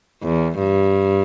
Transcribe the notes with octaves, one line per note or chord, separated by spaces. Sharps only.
E2
G2